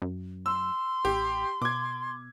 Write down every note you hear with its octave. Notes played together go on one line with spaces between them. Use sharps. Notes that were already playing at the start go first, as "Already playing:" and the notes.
F#2
C6 E6
A1 G4
B2 D6 G#6